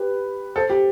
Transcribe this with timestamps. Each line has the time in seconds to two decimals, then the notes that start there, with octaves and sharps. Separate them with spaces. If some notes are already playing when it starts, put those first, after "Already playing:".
Already playing: G4 B4
0.56 A4 C5
0.70 G4